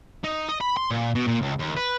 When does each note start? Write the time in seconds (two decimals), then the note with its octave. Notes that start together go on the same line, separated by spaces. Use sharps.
0.24 D#4
0.49 D#5
0.61 B5
0.77 C6
0.91 A#2
1.15 B2
1.27 A#2
1.42 C#2
1.59 D#2
1.76 B4